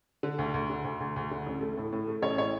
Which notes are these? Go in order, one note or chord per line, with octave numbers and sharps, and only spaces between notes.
D3
D2
D2
D3
D2
D2
D2
D3
A1
A3
A2
A2
A3
A1 C#5
A2 C#5